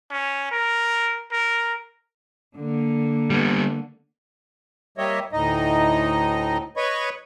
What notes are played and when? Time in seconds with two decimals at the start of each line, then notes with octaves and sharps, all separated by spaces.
0.11 C#4
0.52 A#4
1.31 A#4
2.56 D3 A#3
3.30 G3 B3
4.98 G3 A#3 G4 C#5 D#5 E5
5.32 D2 A2 D#4 D#5
6.77 B4 C#5 D#5 B5 C#6